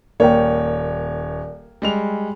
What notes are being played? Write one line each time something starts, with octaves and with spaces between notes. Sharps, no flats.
D#1 A#3 C#5 D5 G5
G3 G#3 F7